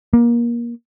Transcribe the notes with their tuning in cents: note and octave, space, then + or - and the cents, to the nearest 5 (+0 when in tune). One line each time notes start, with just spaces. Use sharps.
A#3 +25